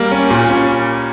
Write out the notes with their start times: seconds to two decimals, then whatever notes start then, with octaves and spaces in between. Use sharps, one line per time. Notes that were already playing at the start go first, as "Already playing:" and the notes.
Already playing: G3 A#3
0.11 C#4
0.30 A#2
0.49 C#4